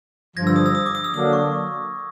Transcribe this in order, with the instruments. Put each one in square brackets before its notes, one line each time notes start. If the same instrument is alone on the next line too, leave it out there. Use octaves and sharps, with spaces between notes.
[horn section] G2 D3 F3 [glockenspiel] G#6 A#6
[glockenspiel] E6
D#6
E6
D#6
D6
D#6
E6
[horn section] D3 F#3 A#3 D4 [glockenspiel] D#6
[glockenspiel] C#6